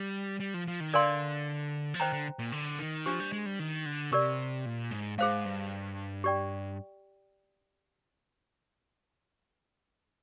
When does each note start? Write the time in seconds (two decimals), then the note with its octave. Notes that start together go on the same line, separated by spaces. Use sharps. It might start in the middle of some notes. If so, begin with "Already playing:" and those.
Already playing: G3
0.40 G3
0.54 F3
0.67 F3
0.80 D#3
0.94 D3 A#4 D5 F5 G#5 C6
1.94 F3
2.00 D#3 C5 G5 A#5
2.13 D3
2.39 A#2
2.52 D3
2.79 D#3
3.06 F3 D4 G4 C5
3.20 G3
3.32 G#3
3.46 G3
3.59 D#3
3.86 D3
4.12 C3 G4 A#4 D5
4.65 A#2
4.91 G#2
5.18 G#2 G#4 C5 F5
5.45 G2
6.24 G4 D5 G5